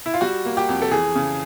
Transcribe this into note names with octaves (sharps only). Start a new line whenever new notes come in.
E4
F4
G3 F#4
A#3
G4
F2
A4
E3 G#4
C#3